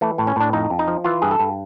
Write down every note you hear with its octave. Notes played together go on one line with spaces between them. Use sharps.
E3 A3
A2
C#4
A2 D4
F2 D#4
F2
D#4
F3
E3 F4
G2 G#4
A4
G2